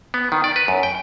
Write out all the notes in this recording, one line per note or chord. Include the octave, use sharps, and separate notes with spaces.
B3
D#3
D5
B4
F#2
G5